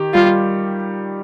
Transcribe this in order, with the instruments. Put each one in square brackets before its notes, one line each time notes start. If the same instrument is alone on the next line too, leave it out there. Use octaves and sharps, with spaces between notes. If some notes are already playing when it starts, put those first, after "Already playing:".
Already playing: [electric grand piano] D#3 G4
[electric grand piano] G3 [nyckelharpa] F4